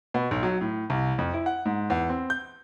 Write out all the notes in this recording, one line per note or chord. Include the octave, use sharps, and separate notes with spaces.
B2
B1
F#3
A2
C2
F2
E4
F#5
G#2
E2
C4
G6